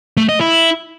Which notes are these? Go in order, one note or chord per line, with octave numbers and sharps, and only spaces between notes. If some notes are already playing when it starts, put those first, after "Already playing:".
A3
D#5
E4